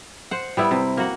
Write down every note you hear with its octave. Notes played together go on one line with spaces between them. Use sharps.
C5 F#5
G3 B3 E4
C3
A#3 F#4 F#5